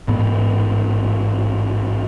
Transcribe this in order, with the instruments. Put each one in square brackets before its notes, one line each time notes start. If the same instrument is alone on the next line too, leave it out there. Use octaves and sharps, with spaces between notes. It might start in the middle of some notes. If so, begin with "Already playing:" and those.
[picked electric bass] A1 G#2 B3